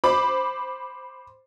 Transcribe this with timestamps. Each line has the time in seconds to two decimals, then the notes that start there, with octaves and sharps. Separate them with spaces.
0.04 C5 B5 D6